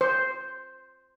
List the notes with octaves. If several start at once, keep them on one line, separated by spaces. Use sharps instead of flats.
C5